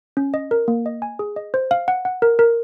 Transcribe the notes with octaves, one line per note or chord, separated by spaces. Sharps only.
C#4
D#5
A#4
A#3
D#5
G#5
G#4
D#5
C5
F5
F#5
F#5
A#4
A#4